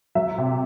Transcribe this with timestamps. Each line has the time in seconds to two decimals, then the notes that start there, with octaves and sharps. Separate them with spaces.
0.15 F#3 E5
0.38 C3